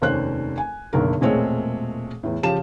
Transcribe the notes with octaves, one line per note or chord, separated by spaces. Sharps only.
F1 D#2 C#4 C5 F#6
G#5
F#1 B1 D3 A#4
E1 A#2 G#3 A3 C4 C#5
E2 A2
C#3 F3 G4 A5 E7